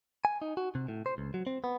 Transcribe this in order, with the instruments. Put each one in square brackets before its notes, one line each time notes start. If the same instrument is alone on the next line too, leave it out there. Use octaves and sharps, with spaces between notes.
[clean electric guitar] G#5
D#4
F#4
C3
A2
C5
C#2
F#3
C4
B3